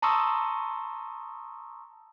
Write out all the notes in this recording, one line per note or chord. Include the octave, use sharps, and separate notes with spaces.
A5 A#5 C6 C#6 D#6 E6